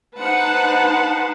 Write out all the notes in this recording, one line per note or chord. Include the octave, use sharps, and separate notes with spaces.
D#4 B4 C5 F#5 A5